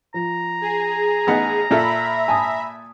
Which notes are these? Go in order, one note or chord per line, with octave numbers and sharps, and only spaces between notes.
F3 A#5
G#4
A1 B3 D#4
A#2 F4 A4 E5 B5
G#5 A5 D#6